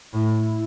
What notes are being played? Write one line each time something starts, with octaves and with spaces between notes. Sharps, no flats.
A2 E4